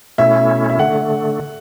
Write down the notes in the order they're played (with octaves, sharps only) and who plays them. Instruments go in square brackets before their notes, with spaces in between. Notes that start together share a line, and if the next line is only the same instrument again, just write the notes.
[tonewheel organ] B2 A3 C#4 E4 [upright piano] E5
[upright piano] E5
[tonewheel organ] D3 A3 [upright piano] F#5